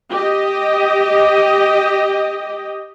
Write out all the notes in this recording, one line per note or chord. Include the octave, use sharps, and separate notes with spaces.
G4 D#5